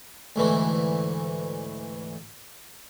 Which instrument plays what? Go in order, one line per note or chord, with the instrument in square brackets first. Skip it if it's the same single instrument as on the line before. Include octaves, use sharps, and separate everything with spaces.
[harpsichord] D2 G#2 E3 A3